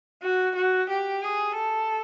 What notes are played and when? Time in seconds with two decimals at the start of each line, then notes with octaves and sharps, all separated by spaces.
0.23 F#4
0.56 F#4
0.90 G4
1.23 G#4
1.56 A4